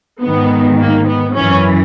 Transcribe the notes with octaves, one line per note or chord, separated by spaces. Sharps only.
G#2 D#3 B3
A#3
B3
F#2 E3 C#4